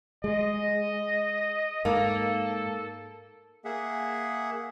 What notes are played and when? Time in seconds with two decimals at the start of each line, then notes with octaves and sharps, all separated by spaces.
0.24 G#3 D#5
1.85 G#2 A#3 A4
3.65 A#3 G#4 E5 F#5